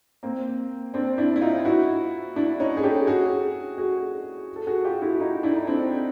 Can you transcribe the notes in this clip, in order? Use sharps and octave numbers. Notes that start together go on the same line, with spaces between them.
A#3 C4
C4 D4
D4 E4
E4
D#4 F4
E4 F#4
D4 E4
C#4 D#4
G#4
G4 A4
F#4 G#4
F#4 G#4
A4
F#4 G#4
F4 G4
E4 F#4
F#4
D#4 F4
D4 E4
D#4
C4 D4